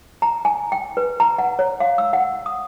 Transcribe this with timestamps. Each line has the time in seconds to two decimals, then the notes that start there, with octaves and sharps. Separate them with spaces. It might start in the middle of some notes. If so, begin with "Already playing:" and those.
0.22 A#5
0.45 G#5
0.72 G5
0.97 B4
1.20 A#5
1.38 F#5
1.59 C#5
1.80 F5
1.98 E6
2.13 F#5
2.46 D#6